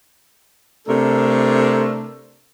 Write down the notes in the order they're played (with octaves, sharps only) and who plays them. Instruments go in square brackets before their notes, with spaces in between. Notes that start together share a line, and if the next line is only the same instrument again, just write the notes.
[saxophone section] C3 A3 D4 A4 A#4